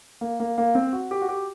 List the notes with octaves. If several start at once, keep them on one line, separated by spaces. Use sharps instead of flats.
A#3
A#3
A#3
C4
F#4
G4
F#4
G4